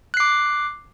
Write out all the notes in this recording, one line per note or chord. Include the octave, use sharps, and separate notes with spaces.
D6 F#6 C7